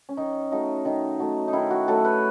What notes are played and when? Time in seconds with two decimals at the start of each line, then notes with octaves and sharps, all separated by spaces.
0.09 C#4
0.17 D#3 D#4
0.52 F#3 A3 D#4
0.85 D#3 D#4
1.20 F#3 A3
1.48 D#4
1.53 D#3 E4
1.70 F#4
1.88 F#3 A3 A4
2.05 B4